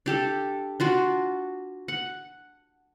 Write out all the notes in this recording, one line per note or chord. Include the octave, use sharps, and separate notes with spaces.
D4 G4 A4
D4 F4 F#4
F#5